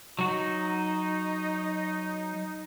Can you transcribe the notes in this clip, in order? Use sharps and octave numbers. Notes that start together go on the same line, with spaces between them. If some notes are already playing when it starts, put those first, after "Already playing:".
F#3 D#4 F#4